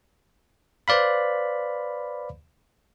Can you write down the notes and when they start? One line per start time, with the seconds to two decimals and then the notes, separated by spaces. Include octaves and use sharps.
0.88 B4 C5 D5 F5 B5